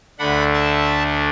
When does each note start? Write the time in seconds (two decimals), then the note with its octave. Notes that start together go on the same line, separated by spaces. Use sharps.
0.18 D2 D3 A3 D4 F#5 B5
0.54 E5 A5